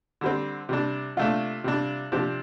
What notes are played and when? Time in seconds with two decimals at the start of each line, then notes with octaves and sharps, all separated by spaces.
0.21 D3 G3 C4
0.69 C3 G3 D4
1.17 C3 A3 D4 F4
1.64 C3 G3 D4
2.12 C3 F3 C4 D4 G4